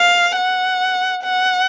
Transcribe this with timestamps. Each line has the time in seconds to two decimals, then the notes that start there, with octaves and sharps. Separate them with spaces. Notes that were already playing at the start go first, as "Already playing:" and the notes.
Already playing: F5
0.37 F#5
1.23 F#5